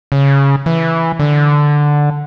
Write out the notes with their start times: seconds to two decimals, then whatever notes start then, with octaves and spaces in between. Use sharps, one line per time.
0.12 C#3
0.66 E3
1.19 D3